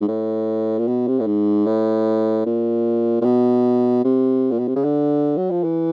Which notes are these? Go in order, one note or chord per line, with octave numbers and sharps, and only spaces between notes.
G#2
A2
A#2
B2
C3
A2
G#2
A2
A#2
A#2
B2
C3
A#2
B2
C3
C#3
D3
F#3
F3
E3